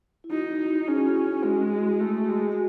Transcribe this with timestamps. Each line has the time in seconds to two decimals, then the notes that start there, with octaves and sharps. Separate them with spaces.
0.24 E4
0.31 D#4 F#4
0.87 C#4 G#4
0.97 F#4
1.05 E4
1.14 F#4
1.44 G#3
2.00 A3
2.29 G#3
2.52 F#4